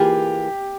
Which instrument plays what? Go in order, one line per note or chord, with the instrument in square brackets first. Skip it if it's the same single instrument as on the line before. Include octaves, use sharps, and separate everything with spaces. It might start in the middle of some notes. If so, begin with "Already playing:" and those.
Already playing: [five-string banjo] E3 A#3 F4 G#4 [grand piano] G4